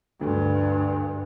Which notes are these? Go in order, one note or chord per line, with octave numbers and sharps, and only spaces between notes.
D2 G2